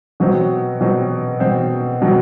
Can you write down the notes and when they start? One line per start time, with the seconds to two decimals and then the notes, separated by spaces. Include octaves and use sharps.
0.20 B2 F#3 C4
0.81 B2 F#3 C4
1.40 B2 F#3 C4
2.02 B2 F#3 C4